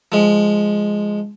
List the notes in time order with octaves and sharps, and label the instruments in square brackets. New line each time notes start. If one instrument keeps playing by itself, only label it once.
[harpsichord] F3 G#3